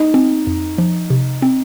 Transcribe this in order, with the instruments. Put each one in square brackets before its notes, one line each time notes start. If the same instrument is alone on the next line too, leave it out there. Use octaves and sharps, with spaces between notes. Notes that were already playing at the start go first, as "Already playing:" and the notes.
Already playing: [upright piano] D#4
[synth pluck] C4
F2
F3
C3
C4